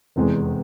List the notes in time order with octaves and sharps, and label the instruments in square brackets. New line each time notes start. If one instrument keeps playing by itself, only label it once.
[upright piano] F1 E2 C3 G#3